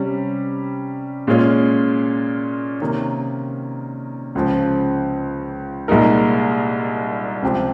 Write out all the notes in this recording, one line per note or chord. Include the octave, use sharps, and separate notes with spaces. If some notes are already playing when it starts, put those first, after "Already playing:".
Already playing: C3 G3 C#4
A#2 G#3 C#4 F4
C3 D#3 A#3 C#4
C#2 C#3 F3
C2 A#2 G#3 D#4 A#4
C#2 C3 F3 C4 G4